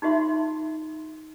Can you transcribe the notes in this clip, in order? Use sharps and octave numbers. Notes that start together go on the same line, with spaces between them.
D#4 F4 F#4 E5 C6